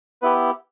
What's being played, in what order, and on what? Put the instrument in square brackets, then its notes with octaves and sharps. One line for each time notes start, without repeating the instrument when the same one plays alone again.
[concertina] B3 E4 G4 B4